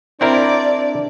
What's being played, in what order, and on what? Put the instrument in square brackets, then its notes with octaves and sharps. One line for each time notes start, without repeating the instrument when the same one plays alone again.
[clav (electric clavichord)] C4 E4 A#4 [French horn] D4 [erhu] D5